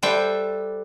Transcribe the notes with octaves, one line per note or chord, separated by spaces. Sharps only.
G3 A4 B4 C5 E5 G5